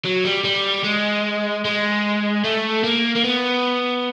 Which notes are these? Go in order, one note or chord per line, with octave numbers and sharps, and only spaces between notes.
F#3
G3
G3
G#3
G#3
A3
A#3
A#3
B3